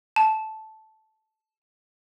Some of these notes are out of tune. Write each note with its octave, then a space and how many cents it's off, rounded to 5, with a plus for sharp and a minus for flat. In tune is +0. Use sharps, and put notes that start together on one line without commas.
A5 -10